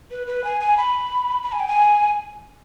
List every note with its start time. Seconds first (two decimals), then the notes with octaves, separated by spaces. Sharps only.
0.11 B4
0.27 B4
0.44 G#5
0.60 G#5
0.77 B5
1.43 B5
1.52 G#5
1.60 G5
1.68 G#5